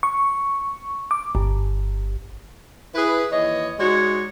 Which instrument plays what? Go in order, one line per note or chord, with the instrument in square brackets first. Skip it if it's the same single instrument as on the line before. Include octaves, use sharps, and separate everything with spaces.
[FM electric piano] C#6
D6
G1
[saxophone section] E4 G#4 B4
D#2 E3 C#5 D#5
G#3 D#4 F#4 C#5 D5